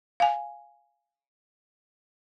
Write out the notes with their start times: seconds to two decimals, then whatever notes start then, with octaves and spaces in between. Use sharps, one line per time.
0.20 F5 G#5